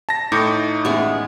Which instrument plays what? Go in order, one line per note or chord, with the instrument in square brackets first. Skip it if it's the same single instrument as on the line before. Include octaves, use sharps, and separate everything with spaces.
[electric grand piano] A5 A#6
[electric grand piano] A2 [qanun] D#4 [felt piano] D6 G6 C#7
[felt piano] A1 E5 [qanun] G#3 B3 C#5